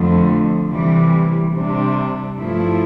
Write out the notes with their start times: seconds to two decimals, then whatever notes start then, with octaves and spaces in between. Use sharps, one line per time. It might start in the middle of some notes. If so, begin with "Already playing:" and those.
Already playing: F2 D3 A3
0.67 C3 E3 G3
1.52 C3 G3 D4
2.37 G2 F3 A3 E4